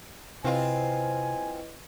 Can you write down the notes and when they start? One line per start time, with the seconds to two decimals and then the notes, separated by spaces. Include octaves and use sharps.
0.45 C3 C4 E4 F4 B4 D#5 G#5